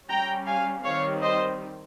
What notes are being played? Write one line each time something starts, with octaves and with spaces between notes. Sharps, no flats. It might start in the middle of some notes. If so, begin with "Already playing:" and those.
G3 C#4 G5 A#5
F5 G#5
D#3 G3 C4 C#5 F5
C5 D#5